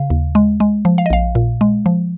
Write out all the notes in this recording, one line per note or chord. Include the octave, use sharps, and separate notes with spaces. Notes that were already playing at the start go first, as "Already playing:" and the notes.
Already playing: C#3 F5
D#2
G#3
G#3
F3
F5
D#5
A#1 F5
A#2
G#3
F3